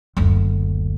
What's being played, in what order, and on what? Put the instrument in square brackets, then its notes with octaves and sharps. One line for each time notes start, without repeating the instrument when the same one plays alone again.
[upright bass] F#1 D2